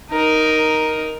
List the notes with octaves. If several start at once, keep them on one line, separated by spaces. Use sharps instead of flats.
D#4 A#4